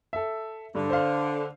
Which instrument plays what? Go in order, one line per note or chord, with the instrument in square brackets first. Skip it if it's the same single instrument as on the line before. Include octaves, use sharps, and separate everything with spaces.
[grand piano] A4 E5
[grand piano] G2 [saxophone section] D3
[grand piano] C5 F5